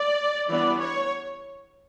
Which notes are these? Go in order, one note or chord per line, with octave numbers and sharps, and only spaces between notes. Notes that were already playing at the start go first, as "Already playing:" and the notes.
Already playing: D5
E3 G3 B3 D4 D5
C#5